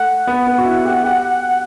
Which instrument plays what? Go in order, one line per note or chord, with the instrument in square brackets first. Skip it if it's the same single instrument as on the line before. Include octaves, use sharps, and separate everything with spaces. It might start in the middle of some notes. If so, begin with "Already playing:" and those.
Already playing: [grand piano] A3 [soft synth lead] F#5
[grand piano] B3
B3
F#4
E4
G4
G4